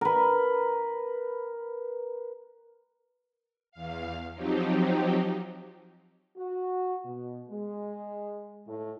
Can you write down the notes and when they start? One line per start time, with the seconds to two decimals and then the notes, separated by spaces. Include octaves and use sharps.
0.01 A#4 B4
3.71 E2 F5
4.34 F3 F#3 C4 D#4 G4
6.37 F#4
7.05 B2
7.49 G#3
8.67 A2